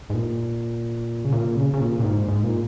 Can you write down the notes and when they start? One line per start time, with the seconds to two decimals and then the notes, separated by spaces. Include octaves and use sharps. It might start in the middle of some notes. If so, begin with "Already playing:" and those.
0.10 G#2
0.14 A#2
1.25 C#3
1.32 A#2
1.56 C#3
1.74 C#3
1.81 A#2
2.00 A#2
2.04 G#2
2.28 G#2
2.43 A#2